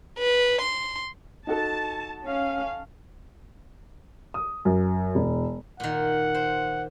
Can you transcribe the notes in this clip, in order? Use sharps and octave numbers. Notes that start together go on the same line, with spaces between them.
B4
C6
D#4 F#4 A4 A5
C#4 F5
D#6
F#2
E1
A#2 D#3 F#5
C5